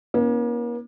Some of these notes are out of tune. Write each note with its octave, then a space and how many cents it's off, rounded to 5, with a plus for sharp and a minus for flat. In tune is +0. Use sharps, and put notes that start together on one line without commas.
A#3 +40 C#4 -5 E4 -35